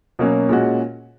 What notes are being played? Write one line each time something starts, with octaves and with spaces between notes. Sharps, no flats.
B2 F#3 A#3 C#4
A#2 G#3 C#4 F#4